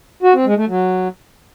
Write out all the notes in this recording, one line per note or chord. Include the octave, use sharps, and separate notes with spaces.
F#4
C4
G#3
A3
F#3